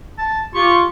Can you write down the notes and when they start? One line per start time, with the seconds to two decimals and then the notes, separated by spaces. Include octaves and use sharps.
0.18 A5
0.54 F4 G4 C#6